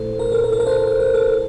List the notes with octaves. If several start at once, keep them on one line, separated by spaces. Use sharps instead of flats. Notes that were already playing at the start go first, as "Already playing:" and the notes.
Already playing: A#2 A3 E4 A4 C5
A#4
A4
A#4
A4
A#4
A4 C5
C5
A#4
A4